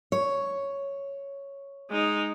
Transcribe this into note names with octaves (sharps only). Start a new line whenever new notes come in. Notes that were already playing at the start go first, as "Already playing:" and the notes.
C#5
G#3 D#4